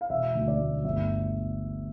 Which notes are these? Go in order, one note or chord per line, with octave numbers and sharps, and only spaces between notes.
F5
E1 E5
D2
D5
A3
G1 E5